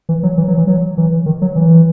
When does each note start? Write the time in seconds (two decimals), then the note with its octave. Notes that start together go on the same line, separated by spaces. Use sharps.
0.09 E3
0.23 F#3
0.38 E3
0.48 F#3
0.58 E3
0.67 F#3
0.97 E3
1.26 D#3
1.42 F#3
1.56 E3